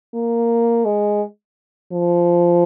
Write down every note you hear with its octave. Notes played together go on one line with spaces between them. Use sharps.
A#3
G#3
F3